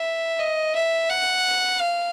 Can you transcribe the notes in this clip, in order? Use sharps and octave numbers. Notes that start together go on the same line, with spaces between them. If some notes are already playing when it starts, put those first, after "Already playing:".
Already playing: E5
D#5
E5
F#5
F5